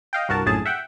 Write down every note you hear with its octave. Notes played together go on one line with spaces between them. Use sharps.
D#5 F5 G5
C2 G2 F#4 A#4 A5
A#1 F#2 A2 G#4 A5 A6
E5 F#5 G5